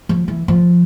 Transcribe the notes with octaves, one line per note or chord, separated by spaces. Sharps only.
F3
E3
F3